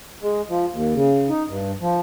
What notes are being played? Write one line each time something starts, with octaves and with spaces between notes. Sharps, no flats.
G#3
F3
D#2
C#3
D#4
G2
F3